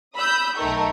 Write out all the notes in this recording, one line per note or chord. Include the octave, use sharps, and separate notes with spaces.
B5 D#6 E6 G6
B1 D#3 A3 A#4 C#6